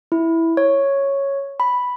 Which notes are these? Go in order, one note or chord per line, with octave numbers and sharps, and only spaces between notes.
E4
C#5
B5